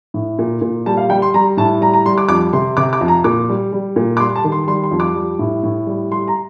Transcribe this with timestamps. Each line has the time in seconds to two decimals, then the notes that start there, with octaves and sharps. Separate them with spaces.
0.14 A2
0.39 A#2
0.61 A#2
0.86 G3 A5
0.97 F5
1.09 G3 G5
1.22 C6
1.34 G3 A#5
1.57 A2 A5
1.81 G3 A#5
1.94 A#5
2.06 G3 C6
2.18 D6
2.29 F2 D6
2.53 C3 C6
2.77 C3 D6
2.93 D6
3.01 F2
3.08 A#5
3.24 A#2 D6
3.49 G3
3.73 G3
3.96 A#2
4.17 D6
4.20 G3 C6
4.36 A5
4.44 D#3
4.52 C6
4.67 G3 C6
4.84 C6
4.91 F2
5.00 D6
5.16 G3
5.39 A2
5.63 A2
5.87 G3
6.11 G3 C6
6.28 A#5